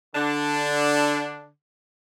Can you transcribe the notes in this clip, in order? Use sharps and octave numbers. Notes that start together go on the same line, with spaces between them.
D3 D4